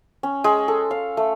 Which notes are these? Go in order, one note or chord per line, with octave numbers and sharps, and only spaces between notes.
C#4
G#3
A4
F5
A3